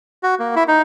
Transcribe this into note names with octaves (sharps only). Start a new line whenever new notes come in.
F#4
A#3
E4
D#4